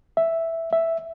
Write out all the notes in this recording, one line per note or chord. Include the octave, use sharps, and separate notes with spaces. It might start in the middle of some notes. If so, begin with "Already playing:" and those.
E5
E5